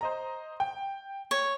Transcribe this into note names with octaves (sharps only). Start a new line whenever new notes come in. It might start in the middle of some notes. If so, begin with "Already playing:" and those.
C5 D#5 A#5
G5
C#5